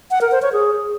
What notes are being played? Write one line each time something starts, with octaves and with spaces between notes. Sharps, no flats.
F#5
A#4
C5
C#5
G#4